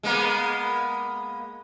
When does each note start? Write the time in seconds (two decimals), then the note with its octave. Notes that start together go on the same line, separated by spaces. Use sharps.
0.03 G#3 A#3 B3